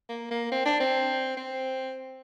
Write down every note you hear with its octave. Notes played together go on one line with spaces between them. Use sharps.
A#3
A#3
C4
D4
C4
C4